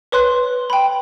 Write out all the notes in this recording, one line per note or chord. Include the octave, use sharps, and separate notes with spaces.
B4 C#5 C6 F#6
G5 B5